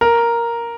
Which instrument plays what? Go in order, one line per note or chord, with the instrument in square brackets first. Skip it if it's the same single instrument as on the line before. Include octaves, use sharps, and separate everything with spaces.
[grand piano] A#4